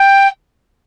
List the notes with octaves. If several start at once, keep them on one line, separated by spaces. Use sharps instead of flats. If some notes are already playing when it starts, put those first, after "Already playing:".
Already playing: G5